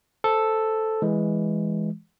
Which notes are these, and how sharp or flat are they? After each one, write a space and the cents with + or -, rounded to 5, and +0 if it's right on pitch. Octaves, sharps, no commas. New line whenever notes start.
A4 +0 C5 +0
E3 +0 G#3 +0